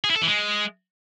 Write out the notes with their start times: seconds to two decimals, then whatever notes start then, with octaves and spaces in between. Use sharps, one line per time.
0.04 G#4
0.10 E4
0.16 A4
0.22 E3
0.28 G#3